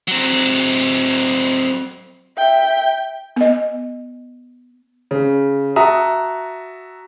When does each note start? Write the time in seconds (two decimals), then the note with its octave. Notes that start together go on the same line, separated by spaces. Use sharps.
0.08 F#3 C4
2.38 E5 G5
3.36 B3 D#5
5.11 C#3
5.76 F#4 E5 A5 A#5 D#6